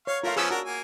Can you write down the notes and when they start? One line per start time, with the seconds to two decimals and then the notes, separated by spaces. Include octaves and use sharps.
0.07 C#5 F5 C#6
0.23 A3 F4 A#4 F5
0.36 F3 B3 C#4 G#4 E6
0.51 D4 F#4 A#4
0.65 A#3 G#5